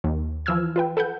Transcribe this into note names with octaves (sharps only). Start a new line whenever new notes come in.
D#2
E3 F3 E6 F6 G#6
F4 B4 G5
A4 B4 F#5 G6